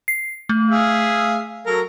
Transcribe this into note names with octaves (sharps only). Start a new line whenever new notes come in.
C7
A3
G#4 E5 F5
F#3 A4 A#4